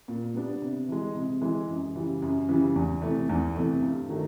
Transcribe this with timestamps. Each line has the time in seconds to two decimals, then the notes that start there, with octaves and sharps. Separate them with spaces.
0.08 A#2
0.34 G3 B3 D4
0.61 C3
0.89 E3 G#3
1.15 C3
1.41 E3 G#3
1.68 F#2
1.95 C#3 E3 G3
2.22 F#2
2.49 C#3 E3 G3
2.76 E2
3.02 C3 E3 A3
3.29 E2
3.55 C3 E3 A3
3.82 G2
4.09 D#3 F#3 A3